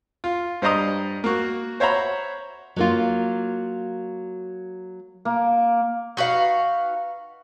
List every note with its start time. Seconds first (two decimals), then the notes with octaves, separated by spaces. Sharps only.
0.24 F4
0.62 G2 C5 D5 D#5 A#5 D#6
1.24 A#3 F#4
1.80 C5 C#5 E5 F#5 A#5 B5
2.76 F#3 A#3 F4
5.25 A#3
6.17 D#4 F#4 B4 F5